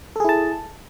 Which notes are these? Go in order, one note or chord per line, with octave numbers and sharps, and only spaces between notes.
E4 G#4 A4 A5